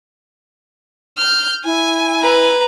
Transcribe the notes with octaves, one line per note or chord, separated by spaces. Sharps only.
F6 G6
E4 G#5
B4 A#5